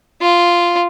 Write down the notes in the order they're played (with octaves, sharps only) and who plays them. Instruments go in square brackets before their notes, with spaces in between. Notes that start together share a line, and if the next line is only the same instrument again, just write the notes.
[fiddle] F4